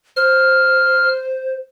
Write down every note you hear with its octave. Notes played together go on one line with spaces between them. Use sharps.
C5 F6